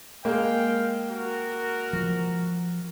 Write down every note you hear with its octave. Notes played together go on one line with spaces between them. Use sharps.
G#3 A#3 F5 G5
F#4 A#4
F3